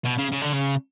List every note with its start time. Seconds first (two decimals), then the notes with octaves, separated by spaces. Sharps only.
0.05 B2
0.18 C#3
0.32 C#3
0.42 D3
0.53 C#3